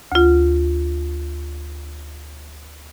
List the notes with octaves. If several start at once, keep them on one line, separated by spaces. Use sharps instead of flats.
D2 F4